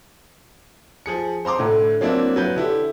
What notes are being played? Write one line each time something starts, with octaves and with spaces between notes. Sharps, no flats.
F3 G#4 C#7
C5 A#5 C6 D6
A2 D3
F#3 A#3 C4 D4 E4
F#3 B4 G6
D3 E4 G4